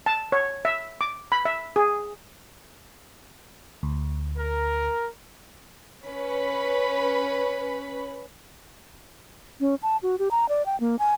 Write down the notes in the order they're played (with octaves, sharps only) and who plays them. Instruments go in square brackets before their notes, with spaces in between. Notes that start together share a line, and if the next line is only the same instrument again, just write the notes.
[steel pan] A5
C#5
E5
D6
B5
E5
G#4
[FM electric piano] D2
[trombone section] A#4
[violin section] C#4 B4 B5
[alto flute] C#4
A5
F#4
G4
A#5
D5
G5
A#3
G#5